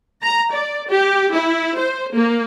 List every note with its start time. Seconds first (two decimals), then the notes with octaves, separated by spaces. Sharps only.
0.23 A#5
0.53 D5
0.90 G4
1.34 E4
1.78 C5
2.15 A#3